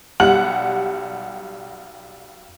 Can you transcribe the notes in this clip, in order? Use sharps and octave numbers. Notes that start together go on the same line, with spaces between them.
B1 G3 F#5 F#7